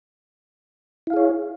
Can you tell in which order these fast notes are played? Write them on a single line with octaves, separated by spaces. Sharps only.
E4 F5 G#4 C#5